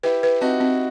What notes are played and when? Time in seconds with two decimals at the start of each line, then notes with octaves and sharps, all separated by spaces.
0.03 E4 G4 B4
0.23 B4
0.41 C4 D#4 F#4
0.60 C4